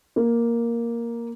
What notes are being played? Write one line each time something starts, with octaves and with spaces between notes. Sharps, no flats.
A#3